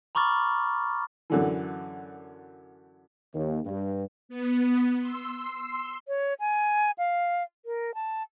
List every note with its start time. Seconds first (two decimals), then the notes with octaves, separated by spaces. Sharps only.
0.15 A#5 B5 C#6 D6 F6 A6
1.30 F#2 D3 E3
3.33 D#2
3.65 G2
4.29 B3
5.00 C6 E6
6.08 C#5
6.40 G#5
6.98 F5
7.66 A#4
7.94 A5